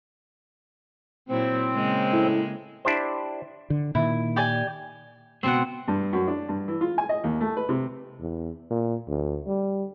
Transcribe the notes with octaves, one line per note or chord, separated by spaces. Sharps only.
A#2 F#3 C4 E4
C#3 G#3 A#3
A2
D4 E4 G4 C5
D3
A#2 D#3 E4
G4 D5 G#5
C#2 B2 C4 F#5
G2
F#2
D4
G2
E3
F4
G#5
D#5
D#2
A3
B4
C3
E2
A#2
D2
G3